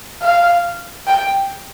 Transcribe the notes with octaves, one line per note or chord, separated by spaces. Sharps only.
F5
G5